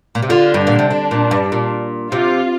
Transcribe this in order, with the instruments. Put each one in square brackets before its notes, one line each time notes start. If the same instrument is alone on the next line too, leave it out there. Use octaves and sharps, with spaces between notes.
[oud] A#2
C3
[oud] D3 [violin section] F4
[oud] G2
[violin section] D4
[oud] A#2
C3
D3
A#2
G2
A#2
[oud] C3 [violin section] F4